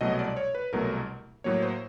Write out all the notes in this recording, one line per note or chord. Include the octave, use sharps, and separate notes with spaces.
C2 B2 F#3 A3 D#5
D5
C#5
B4
C2 B2 F#3 A3 A#4
A2 F#3 A#3 C#5
C5